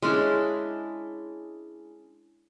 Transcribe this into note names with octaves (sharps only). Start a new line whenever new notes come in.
G#3 C#4 D4 E4